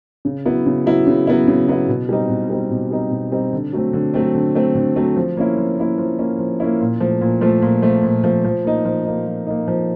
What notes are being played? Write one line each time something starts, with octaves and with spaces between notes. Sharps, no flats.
C#3
F#3 B3 E4
C#3
F#3 B3 E4
C#3
F#3 B3 E4
C#3
F#3 B3 E4
B2
G3 C4 D#4
B2
G3 C4 D#4
B2
G3 C4 D#4
B2
G3 C4 D#4
D3
F#3 A3 C4
D3
F#3 A3 C4
D3
F#3 A3 C4
D3
F#3 A3 C4
F3
A#3 C#4 E4
F3
A#3 C#4 E4
F3
A#3 C#4 E4
F3
A#3 C#4 E4
A#2
F3 A3
A#2
F3 A3
A#2
F3 A3
A#2
F3 A3
F3
A#3 D#4
F3
A#3 D#4
F3
A#3 D#4
F3